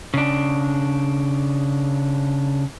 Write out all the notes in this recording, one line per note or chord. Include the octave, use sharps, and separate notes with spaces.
C#3 D4